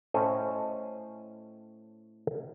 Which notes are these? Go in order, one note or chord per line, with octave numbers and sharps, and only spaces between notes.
A2 C#4 A4 C5 D#5 G#5